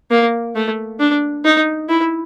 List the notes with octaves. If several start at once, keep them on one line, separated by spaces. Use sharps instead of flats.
A#3
A3
D4
D#4
E4